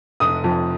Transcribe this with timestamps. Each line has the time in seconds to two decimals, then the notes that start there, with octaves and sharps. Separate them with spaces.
0.20 F1 D#6
0.44 F2